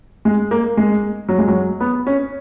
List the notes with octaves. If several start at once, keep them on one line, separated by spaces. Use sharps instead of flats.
G#3
A#3
G#3
F#3
G#3
F#3
B3
C#4